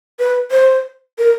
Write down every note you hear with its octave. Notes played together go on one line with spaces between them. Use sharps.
B4
C5
A#4